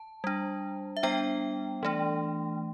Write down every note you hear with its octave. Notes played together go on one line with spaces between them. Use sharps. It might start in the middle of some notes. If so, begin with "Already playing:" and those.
Already playing: A5
G3 D4
E5
G3 B3 D4 G5
E3 A3 D4